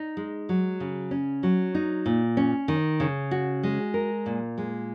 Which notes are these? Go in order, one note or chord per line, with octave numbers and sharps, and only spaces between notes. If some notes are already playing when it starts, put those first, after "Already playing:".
Already playing: D#4
G#3
F#3
C#3
C#4
F#3
D#4
A#2
C#4
D#3
C#3
F#4
G#3
A#4
A#2
G#3